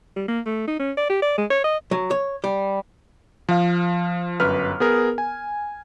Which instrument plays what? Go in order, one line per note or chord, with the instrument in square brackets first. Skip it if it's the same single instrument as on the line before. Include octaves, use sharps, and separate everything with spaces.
[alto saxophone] G3
A#3
A3
D#4
C#4
D5
G4
D5
G#3
C#5
D#5
[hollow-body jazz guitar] F#3
C#5
G3
[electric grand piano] F3 F5
G1 F#2 B4 F6
B3 G#4 A#4
G#5